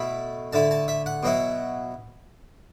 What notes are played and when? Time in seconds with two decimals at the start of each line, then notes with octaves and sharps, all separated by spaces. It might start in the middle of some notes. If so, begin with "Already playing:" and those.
Already playing: B2 A3 E4 B5
0.53 D3 A3 E4 A5
0.71 A5
0.88 E5
1.06 F#5
1.23 B2 F#3 B3 E4